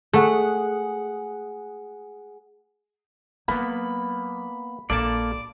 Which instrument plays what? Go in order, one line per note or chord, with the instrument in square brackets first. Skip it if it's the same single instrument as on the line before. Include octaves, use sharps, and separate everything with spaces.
[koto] A3 [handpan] G#4 F#5
[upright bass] F#3 [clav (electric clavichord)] A#3 B3 [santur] B5
[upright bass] A#1 [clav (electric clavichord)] A#3 A4 [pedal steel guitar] D5 A5